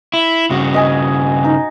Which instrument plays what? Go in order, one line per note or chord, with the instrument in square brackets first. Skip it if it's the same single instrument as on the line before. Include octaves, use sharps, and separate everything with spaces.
[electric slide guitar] E4
[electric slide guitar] G2 C#3 [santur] F#4
[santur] D#5 G#5
D#4